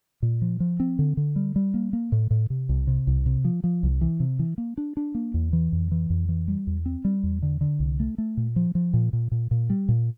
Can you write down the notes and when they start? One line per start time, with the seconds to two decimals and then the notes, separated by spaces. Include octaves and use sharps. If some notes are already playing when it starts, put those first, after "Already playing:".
0.22 A#2
0.42 F3
0.60 F3
0.80 C4
0.99 D3
1.17 D3
1.36 G3
1.56 G3
1.74 A#3
1.93 A#3
2.12 A2
2.31 A2
2.50 C3
2.69 C2
2.87 C3
3.07 C2
3.26 C3
3.45 F3
3.64 F3
3.83 C2
4.01 E3
4.20 C3
4.39 E3
4.58 A#3
4.77 D4
4.97 D4
5.15 A#3
5.34 E2
5.53 E3
5.72 F2
5.91 E3
6.10 F2
6.29 E3
6.48 G3
6.67 E2
6.86 C4
7.05 G3
7.23 E2
7.42 D3
7.61 D3
7.80 C2
8.00 A3
8.18 A3
8.37 A#2
8.56 F3
8.75 F3
8.94 A#2
9.13 A#2
9.32 A#2
9.51 A#2
9.70 G3
9.89 A#2